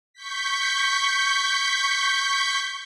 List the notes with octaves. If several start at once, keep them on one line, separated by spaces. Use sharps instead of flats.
C#6 G6 B6